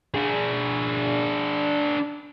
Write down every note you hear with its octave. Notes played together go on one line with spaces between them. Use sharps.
D4 G#4